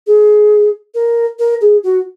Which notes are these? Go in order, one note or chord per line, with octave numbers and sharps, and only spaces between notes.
G#4
A#4
A#4
G#4
F#4